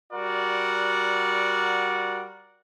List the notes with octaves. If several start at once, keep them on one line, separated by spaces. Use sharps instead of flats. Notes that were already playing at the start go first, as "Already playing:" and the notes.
G3 F#4 A#4 D5 F#5